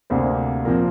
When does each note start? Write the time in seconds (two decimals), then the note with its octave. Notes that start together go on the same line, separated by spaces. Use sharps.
0.10 D2 C3 A#3 D4 C5
0.65 A#2 F3 C4 A#4